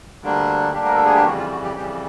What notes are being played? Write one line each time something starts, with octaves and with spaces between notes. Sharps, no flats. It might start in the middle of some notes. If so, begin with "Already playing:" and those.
D2 D3 G3 A#3 D4
D2 D3 G3 A#3 D4 G4
A#4
A4
G#4
G4
F2 C#3 E3 G3 F#4
F4
F#4
G4
F2 C#3 E3 G3 G4